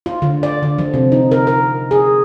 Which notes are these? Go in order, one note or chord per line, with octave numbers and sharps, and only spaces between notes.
F4
D3
D5
D3
F3
C3
D#4
A#4
A#4
G#4